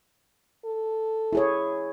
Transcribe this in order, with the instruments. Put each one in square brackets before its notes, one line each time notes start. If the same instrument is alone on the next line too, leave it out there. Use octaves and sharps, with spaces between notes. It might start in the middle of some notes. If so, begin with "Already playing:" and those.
[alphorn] A4
[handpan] E4 G#4 C#5